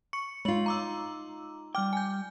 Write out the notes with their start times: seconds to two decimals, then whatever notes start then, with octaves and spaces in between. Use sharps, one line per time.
0.13 C#6 C#7
0.45 G#3 D#4 F4 F#7
0.66 A#5 D6 E6
1.75 G3 G5 D6 F6
1.93 G#5 G6